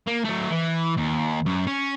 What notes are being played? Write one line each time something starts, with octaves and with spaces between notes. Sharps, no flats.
A#3
F#3 A3
E3
D#2
F#2
C#4